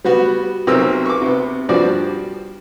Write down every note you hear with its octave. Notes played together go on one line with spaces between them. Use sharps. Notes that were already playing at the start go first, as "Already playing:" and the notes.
G3 B3 F#4
B1 C3 F#3 C4 A#4 E6
C#6 D6
C3 B3
G2 F3 G3 F#4 D5